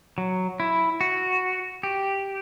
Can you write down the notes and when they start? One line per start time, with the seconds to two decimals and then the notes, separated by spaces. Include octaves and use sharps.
0.18 F#3
0.60 E4
1.01 F#4
1.83 G4